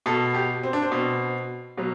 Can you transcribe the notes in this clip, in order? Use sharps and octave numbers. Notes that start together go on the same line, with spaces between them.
B2 A4
G4
C4
D4
C4
B2
B2 F#3